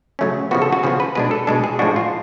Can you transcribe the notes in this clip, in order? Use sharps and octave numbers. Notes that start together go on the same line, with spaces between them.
C#3 F#3 A3 C#4
C#3 F3 B3 F#4
A4
F#4
C#3 F3 B3 G#4
B4
B2 G#3 D4 B4
A4
B2 G#3 D4 A4
G#4
A2 F3 G#3 D4 F#4
F4